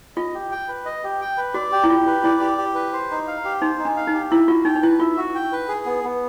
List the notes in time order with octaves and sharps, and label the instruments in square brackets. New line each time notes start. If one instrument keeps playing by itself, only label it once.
[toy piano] F4 [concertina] D#5
[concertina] G4
G5
B4
D#5
G4
G5
B4
[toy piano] F#4 [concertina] D5
[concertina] G4
[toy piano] E4
[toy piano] F4 [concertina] G4
[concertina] B4
[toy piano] E4 [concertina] D5
[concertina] G4
G4
B4
C5
D#4
F5
G4
[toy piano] D#4 [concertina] C5
[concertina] D#4
[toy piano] D4
[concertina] F5
[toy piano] D#4
[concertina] G4
[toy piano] E4 [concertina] E5
[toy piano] F4 [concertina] F#4
[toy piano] D#4 [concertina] G5
[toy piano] D#4
[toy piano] E4 [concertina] B4
[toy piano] F4 [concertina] E5
[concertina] F#4
G5
B4
G#4
B3
B3